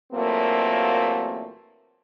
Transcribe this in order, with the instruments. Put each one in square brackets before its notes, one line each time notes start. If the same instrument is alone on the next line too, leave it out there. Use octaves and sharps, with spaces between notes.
[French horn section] E2 A#2 F#3 A3 A#3 C4